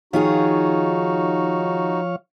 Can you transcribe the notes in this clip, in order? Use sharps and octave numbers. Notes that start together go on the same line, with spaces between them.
D#3 F3 D#4 F4 F#4 G#4 C#5 F5